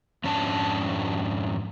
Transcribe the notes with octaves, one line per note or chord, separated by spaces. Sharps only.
F2 G#2 C#4 D4 A5